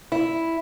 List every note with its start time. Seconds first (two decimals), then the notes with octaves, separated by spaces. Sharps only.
0.12 E4